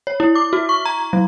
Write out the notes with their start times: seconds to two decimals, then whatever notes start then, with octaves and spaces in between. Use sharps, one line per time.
0.07 C#5
0.20 E4
0.35 D6
0.53 F#4
0.69 C#6
0.85 A#5
1.13 F#3